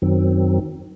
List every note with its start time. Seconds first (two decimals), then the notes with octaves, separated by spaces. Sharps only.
0.02 F#2 D#3 F#3 C4